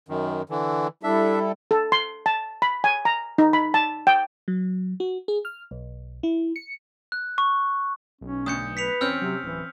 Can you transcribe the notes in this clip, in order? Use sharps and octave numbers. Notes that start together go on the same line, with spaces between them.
F#2 D#3
D3 E3
G3 D4 E4 A4 E5
A4
C6
A5
B5
G#5
A#5
D#4
B5
A5
G5
F#3
F#4
G#4
F6
B1
E4
C#7
F#6
C#6
B1 C#4
D2 D#6 G6 C#7
B4 B6 C#7 F7
E2 C4 C#4 E6 F6 G6
C3 F#3
D1 E3